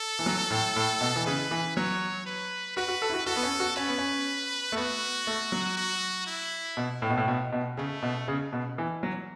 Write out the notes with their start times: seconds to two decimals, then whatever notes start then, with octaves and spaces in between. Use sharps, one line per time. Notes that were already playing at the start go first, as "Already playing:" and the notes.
Already playing: A4
0.19 E3
0.26 F#3
0.50 A2
0.76 A2
1.01 B2
1.16 E3
1.26 C#3 B4
1.51 E3
1.77 F#3 C#5
2.26 B4
2.76 F#4 B4
2.88 F#4
3.02 A4
3.10 E4
3.14 F#4
3.26 F#4 A4
3.36 B3
3.43 C#4
3.60 F#4
3.76 C#4 B4
3.88 B3
3.98 C#4
4.72 A3
4.77 B3 F#4
5.27 A3
5.52 F#3
5.77 F#4
6.27 E4
6.77 B2
7.02 A2
7.10 B2
7.17 A2
7.28 B2
7.52 B2
7.77 C#3 A3
8.03 B2
8.28 C#3
8.53 B2
8.78 E3
9.03 F#3